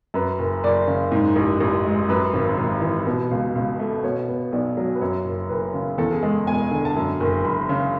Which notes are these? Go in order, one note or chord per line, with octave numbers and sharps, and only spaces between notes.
F#2 B4
F#1
F#1 D5
C#3
G#2
A1
A1
G#3
F#2 B4
G#1
G#1
E3
B2
C#2
C#2
A3
B2 C#5
B3
B1 D5
F#3
B4
F#2 C#5
F#1
F#1 B4
C#3
E2 A4
G#4
G#3 A4
E1 G#5
D3
A5
F#2 G#5
F#1
F#1 B5
C#3